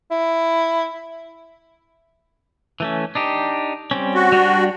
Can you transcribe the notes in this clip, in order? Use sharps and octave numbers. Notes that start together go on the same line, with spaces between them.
E4
E3 A3 C#4
D4 D#4 G4
G3 C4 C#4
F#4
G3 D4